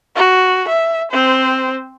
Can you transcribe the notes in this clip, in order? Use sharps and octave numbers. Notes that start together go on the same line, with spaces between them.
F#4
E5
C4 C5